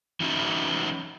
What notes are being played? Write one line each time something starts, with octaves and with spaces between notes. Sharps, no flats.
E3 F#3 C#4 D#4 E4